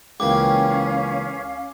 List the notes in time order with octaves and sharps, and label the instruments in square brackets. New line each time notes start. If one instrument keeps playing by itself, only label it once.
[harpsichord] C#2 E3 A#3 [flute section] C#4 F5 [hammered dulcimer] G4 [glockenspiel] D6